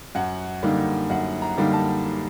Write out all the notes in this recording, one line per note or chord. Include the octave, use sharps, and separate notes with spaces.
F#2 F#5
D3 G3 A#3 D#4
F#2 F#5
A#5
D3 G3 A#3 D#4
A5